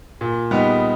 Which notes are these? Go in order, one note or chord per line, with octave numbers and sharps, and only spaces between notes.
A#2
G3 B3 D#4